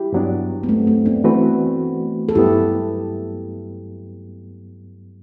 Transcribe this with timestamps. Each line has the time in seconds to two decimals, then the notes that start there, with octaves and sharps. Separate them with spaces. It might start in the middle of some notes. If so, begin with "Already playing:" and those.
Already playing: E4 G4
0.13 G2 F#3 B3 D4
0.63 B3
0.69 A3 C4
0.87 A3 C4
1.06 B3 D4
1.24 E3 A3 C4 F#4 B4
2.29 A4
2.35 G2 F#3 B3 E4 G4